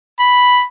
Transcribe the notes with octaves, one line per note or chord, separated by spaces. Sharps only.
B5